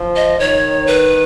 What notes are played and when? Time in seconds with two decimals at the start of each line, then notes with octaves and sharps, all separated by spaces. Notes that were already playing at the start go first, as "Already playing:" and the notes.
Already playing: F3
0.16 D#5
0.39 D#3 C#5
0.87 B4